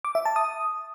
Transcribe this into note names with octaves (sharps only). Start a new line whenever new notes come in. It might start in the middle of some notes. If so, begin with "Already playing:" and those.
D6
E5
A5
D#6